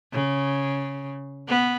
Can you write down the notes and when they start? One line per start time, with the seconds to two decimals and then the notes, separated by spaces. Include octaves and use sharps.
0.13 C#3
1.48 B3